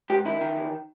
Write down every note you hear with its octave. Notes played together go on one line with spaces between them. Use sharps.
G#2 G4
D#3 E4
D#3
E2